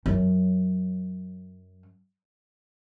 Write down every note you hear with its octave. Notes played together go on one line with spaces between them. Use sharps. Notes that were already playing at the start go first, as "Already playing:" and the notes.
F#2 F#3